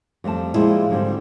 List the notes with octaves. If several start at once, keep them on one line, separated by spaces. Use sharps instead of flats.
F2 G3 A3 A5
A#2 F3 G3 G#3 E4 F4
G#2 D3 G3 C4